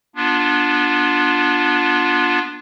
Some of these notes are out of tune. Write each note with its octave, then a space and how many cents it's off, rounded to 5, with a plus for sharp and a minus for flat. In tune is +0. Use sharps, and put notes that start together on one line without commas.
B3 -30 D4 +0 F4 +0